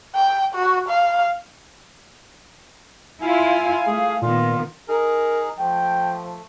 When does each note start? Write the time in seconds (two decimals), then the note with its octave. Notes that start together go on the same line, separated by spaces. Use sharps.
0.15 G5
0.55 F#4
0.89 F5
3.22 E4 F4 F5 G#5
3.87 A3 G#4
4.22 A#2 D#3 B3 F4
4.89 D#4 G#4 A#4
5.59 F3 A3 G5